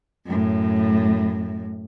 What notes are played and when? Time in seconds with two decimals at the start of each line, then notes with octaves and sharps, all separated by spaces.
0.26 F#2 A2